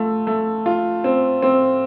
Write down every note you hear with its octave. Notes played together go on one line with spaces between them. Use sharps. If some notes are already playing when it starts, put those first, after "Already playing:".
Already playing: A3 F4
A3
F4
C4
C4